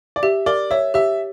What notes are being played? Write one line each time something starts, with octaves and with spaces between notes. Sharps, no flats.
D5
G4 E5
A#4 D5
C#5 E5
G4 E5